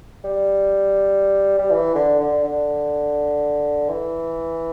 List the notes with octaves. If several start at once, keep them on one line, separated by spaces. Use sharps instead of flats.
G3
G3
E3
D3
D3
D3
E3